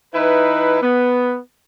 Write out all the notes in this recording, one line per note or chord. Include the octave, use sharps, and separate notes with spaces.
E3 D#4 E4 B4
B3